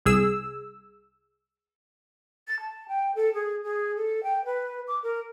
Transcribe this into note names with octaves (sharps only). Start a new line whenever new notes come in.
C2 G#4 E6
A6
A5
G5
A4
G#4
G#4
A4
G5
B4
D6
A#4